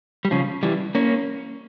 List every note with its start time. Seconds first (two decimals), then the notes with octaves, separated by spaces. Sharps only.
0.25 G3
0.31 C#3 F3
0.63 E3 G3
0.95 A#3 C#4